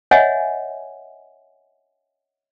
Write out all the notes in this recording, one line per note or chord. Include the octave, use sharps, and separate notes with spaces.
C#5 D#5 E5 F#5 G#5